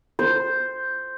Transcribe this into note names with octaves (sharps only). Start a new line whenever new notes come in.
C5